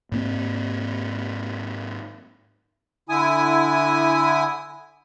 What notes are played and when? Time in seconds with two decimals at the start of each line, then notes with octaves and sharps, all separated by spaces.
0.12 G#2 A#3 C4
3.09 D3 E4 G#5 D#6